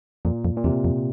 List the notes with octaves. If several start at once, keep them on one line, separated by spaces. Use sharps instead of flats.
F2 A#2
F2
A#2
E2 C3
F2